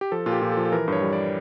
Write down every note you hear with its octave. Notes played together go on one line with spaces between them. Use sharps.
G4
F3 A4
A#2 F4
G4
A#2
A4
F3
A4
E3 A#4
G2 C#5
G3
D5